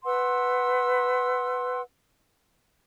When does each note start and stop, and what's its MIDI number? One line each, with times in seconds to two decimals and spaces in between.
0.05 1.81 71
0.05 1.81 78
0.05 1.81 84
0.05 1.81 88